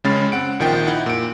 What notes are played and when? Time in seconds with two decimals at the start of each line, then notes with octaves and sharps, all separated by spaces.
0.04 C#2 C#3 G#3 C#4 B5 A6
0.32 C4 F#5 D7
0.60 A#1 D#3 F3 G5
0.87 D#4 E4 F#5
1.06 A#2 D7